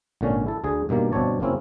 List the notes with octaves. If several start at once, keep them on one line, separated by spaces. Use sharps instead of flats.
G#1 A#2 D3 C#4
E4 A4
D2 D3 G#4
G2 B2 D#3 A#3
G1 B2 C4 D4 C#5 A5
F#2 C#3 A#3 C4 C#4 E4